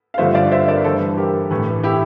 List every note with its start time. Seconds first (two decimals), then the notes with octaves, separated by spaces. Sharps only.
0.14 F5
0.18 G2 D3 F3 A3 C5 E5
0.35 D5 F5
0.52 C5 E5
0.68 A#4 D5
0.84 G2 E3 A3 A4 C5
1.17 G4 A#4
1.51 A2 E3 A3
1.84 E4 G4